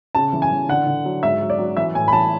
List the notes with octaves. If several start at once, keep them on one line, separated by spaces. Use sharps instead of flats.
C#3 A5
E3
G#5
E3
D3 F#5
D3
F#3
G#2 E5
F#3
D5
F#3
E3 E5
A2 G#5
B5
E3 A5